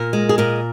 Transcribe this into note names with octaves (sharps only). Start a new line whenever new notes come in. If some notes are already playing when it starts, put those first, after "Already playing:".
Already playing: A#2 A#4
G#3
G#4
A#2 A#4